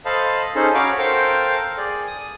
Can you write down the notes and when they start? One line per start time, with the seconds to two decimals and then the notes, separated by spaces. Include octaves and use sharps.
0.05 A4 C5 D#5 F5 A5 B5
0.55 C#4 D#4 G#4 A4 C5
0.74 C#4 F#4 C#5 F5 B5 D6
0.98 A4 A#4 C5 F5 G5
1.77 G#4 D5
2.07 D#6